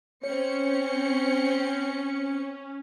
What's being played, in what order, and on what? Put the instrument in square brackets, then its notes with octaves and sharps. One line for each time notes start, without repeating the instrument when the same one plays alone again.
[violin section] C4 C#7 [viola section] C#4 [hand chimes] C#5